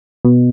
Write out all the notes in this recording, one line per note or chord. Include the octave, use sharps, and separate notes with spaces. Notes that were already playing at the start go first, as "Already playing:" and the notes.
B2